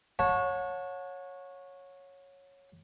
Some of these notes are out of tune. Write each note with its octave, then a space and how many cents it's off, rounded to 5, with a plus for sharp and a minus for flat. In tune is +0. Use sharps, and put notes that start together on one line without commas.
C#5 -10 F#5 -35 A5 +0